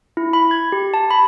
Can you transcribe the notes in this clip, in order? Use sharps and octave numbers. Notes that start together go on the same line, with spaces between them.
E4
B5
G#6
G4
A5
B5